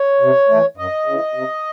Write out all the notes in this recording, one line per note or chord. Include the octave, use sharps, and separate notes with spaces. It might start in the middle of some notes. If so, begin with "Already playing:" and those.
Already playing: C#5
C3
E3 A3
F#2 D#5
C#3 E3
C3